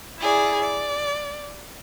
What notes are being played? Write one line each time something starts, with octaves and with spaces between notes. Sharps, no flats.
E4 G#4 D5
D5